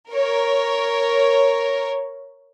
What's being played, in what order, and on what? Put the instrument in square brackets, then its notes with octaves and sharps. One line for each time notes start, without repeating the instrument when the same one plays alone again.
[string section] A#4 C#5